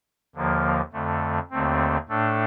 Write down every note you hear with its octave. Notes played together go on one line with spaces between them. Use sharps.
D#2 D3 F3 A#3
F2 D3 A3
D#2 D3 A3 C4
A2 A3 D4 A4